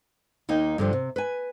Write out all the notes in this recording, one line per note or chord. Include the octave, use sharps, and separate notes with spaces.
D#2 A#3 D#4 G5
G2 D3 F3 G3
C3
B4 G#5